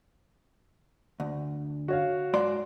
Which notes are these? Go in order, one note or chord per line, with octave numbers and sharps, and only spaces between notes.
D2
F#4 C#5 F5
G#2 D5 C6